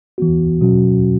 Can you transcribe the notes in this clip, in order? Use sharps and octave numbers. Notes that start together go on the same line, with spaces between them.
E3 B3 F#4
B2 F#3 C#4 F#4